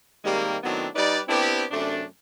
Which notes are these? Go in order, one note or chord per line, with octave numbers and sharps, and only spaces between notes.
C3 D#3 G3 G#3 A#3
A2 D#3 F#3 B3 C4 D4
G3 D#4 B4 D5
B3 C4 D4 E4 G4
F#2 C3 A3 D4